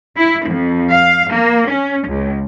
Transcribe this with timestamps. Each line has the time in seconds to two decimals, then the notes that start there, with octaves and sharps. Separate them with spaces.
0.17 E4
0.47 F2
0.94 F5
1.33 A#3
1.69 C#4
2.09 C#2